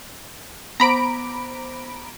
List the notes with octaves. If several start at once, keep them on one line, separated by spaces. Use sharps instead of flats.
B3 C5 A#5 B5 D6 D7